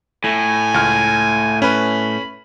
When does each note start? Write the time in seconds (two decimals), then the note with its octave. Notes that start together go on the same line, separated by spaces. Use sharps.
0.24 A2 G#5
0.74 C#2 F6
1.62 C#4 B4 B5